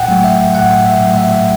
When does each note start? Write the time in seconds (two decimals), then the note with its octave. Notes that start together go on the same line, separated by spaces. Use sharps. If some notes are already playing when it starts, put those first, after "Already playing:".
Already playing: A2 F#5 G5
0.08 F#3 A3
0.24 E5
0.55 A2 F#5
0.86 E5
1.01 F#3 A3
1.17 E5